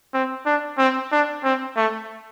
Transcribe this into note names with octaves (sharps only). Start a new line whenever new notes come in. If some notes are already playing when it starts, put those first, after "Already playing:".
C4
D4
C4
D4
C4
A3